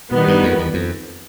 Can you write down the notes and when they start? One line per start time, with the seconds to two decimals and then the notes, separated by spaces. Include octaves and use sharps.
0.11 B2 D#3 G3 B3
0.28 G2
0.43 F2
0.58 E2
0.74 F2